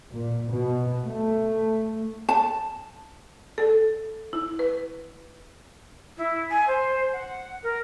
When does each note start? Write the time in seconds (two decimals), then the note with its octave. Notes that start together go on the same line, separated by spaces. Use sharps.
0.11 A#2
0.51 B2
1.06 A3
2.29 A5
3.58 A4
4.33 E4
4.59 B4
6.17 E4
6.50 G#5
6.67 C5
7.13 F#5
7.63 A#4